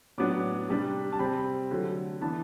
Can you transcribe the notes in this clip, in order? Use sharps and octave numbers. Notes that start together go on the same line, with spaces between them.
A2 F#3 B3 D4 D6
C3 G3 D4
A5
C3 G3 C4 B5
D3 F#3 A3
E3 B3 D4 A5